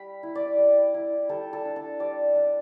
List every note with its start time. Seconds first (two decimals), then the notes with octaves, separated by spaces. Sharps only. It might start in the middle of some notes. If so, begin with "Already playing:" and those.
Already playing: G3 B5
0.23 E4
0.35 D5
0.58 G3
0.94 E4
1.29 G3 A4
1.53 A4
1.65 D4
1.76 A4
2.00 G3 D5
2.35 D4